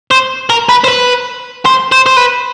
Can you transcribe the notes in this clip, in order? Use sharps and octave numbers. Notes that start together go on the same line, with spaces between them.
C5
A#4
B4
C5
B4
C5
C5
C5
B4